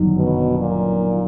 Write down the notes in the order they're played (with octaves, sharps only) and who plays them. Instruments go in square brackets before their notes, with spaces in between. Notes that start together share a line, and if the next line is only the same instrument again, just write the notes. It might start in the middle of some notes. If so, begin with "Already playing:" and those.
Already playing: [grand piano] G1 F#2 D#3
[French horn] B2
A#2